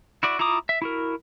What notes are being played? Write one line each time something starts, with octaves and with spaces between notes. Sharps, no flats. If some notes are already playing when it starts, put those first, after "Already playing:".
E4 F#4 D5
E4 F4 A#5 D6 D#6
E5
E4 F#4 A#4